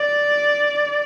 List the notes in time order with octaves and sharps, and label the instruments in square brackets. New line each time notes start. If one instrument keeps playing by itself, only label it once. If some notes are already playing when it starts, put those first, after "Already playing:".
Already playing: [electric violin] D5